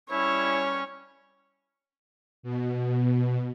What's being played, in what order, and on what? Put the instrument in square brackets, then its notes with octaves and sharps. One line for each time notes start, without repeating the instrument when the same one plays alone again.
[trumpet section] G3 C#4 [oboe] E4 [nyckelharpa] C#5
[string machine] B2